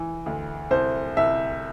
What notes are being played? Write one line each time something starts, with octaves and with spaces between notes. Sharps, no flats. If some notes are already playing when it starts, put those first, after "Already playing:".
Already playing: E3
D2
C2 C5
C2 E5